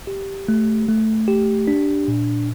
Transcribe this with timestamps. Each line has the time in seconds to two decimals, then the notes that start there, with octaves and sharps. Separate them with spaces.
0.07 G4
0.48 A3
0.89 A3
1.28 G4
1.68 D4
2.08 A#2